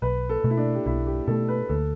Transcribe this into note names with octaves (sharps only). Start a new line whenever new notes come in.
B1 B4
A4
B2 A3
E4
D4
G4
B1 E4
G4
B2 A3 A4
B4
D2 A4